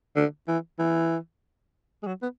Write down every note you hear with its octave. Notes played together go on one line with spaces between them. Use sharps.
D3
E3
E3
G#3
F#3
B3